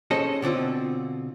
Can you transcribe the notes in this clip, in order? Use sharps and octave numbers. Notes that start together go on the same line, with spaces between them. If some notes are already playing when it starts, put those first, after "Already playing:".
C#4 G#4 A4 C5 D#5
B2 D3 C4 F4